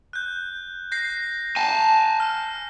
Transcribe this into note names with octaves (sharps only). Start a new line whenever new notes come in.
F#6 G6
G6 A#6 C7
G#5 A5
F6